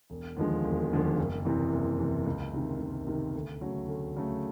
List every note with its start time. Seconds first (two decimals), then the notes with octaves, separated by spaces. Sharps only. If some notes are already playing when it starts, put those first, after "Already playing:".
0.10 E1
0.37 D#2 D3 F3 G#3
0.64 E1
0.91 D#2 D3 F3 G#3
1.17 F#1
1.45 E2 C3 E3
1.73 F#1
1.99 E2 C3 E3
2.26 C#2
2.54 C3 D#3
2.80 C#2
3.07 C3 D#3
3.35 D2
3.61 C#3 F#3 A3
3.88 D2
4.16 C#3 F#3 A3